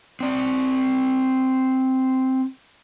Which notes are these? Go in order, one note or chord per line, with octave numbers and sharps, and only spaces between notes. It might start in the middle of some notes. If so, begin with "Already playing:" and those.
C4 D5